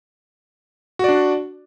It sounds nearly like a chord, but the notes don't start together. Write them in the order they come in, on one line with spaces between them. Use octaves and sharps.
F#4 D5 D4